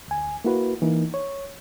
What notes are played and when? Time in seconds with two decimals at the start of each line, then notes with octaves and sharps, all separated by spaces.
0.08 D2 G#5
0.44 A#3 E4 F#4 B4
0.82 E3 A#3 D#4
1.14 C#5